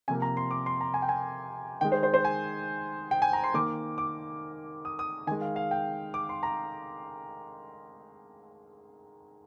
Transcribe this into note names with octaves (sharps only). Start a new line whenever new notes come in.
C3 F3 A#3 G#5
A#5
C6
D6
C6
A#5
G#5
G5
G#5
D#3 G#3 G5
C5
C5
C5
G#5
G5
G#5
A#5
C6
D#3 A#3 D6
D6
D#6
D#6
D#3 G#3 G#5
F5
F5
G5
D6
C6
A#5